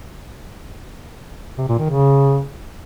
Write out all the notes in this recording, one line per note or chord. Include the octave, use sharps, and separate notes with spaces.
C3
A#2
D#3
C#3